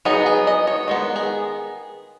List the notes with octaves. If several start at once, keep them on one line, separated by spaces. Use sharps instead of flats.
F#3 B3 D#4 G#4
G#4
D#5
C#5
D#3 G#3 B3
G#4